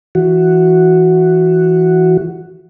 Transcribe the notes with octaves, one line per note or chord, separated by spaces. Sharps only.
E3 F#4